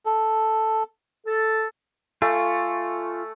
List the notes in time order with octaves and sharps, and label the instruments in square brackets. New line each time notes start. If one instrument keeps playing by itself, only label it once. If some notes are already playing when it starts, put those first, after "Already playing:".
[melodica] A4
[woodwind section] A4
[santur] A3 [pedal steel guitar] F4 [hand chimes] G#5